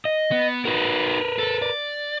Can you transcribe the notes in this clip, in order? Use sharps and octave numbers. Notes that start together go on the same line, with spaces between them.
D#5
B3
D#4 F#4 A#4 B4
A4
D5